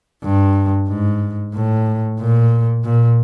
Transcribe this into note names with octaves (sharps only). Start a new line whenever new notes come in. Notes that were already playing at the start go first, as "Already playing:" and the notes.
G2
G#2
A2
A#2
A#2